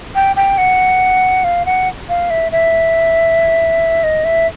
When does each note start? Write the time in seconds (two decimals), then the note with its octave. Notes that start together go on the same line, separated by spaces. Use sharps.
0.15 G5
0.36 G5
0.58 F#5
1.44 F5
1.66 F#5
2.09 F5
2.30 E5
2.52 E5
4.03 D#5
4.24 E5